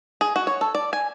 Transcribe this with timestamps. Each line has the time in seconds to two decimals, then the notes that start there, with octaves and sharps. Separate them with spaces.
0.21 G#4
0.36 F#4
0.47 C#5
0.61 A4
0.75 D5
0.93 G#5